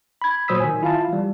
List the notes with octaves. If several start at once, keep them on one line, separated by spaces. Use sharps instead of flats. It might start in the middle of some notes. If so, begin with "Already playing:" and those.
B5 G#6
A#2 F#3 C5 D#6 E6 B6
D#3 G#5
E4 F4 F5 A5
E3 G3